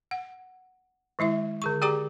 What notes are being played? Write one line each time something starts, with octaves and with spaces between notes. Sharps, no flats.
F#5
D#3 G#3 E4 E5
D3 G#4 C#6
G4 G#4 D5 G5 A#5 D6